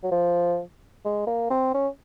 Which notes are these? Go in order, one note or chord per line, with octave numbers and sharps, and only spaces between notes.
F#3
F3
G#3
A#3
C4
C#4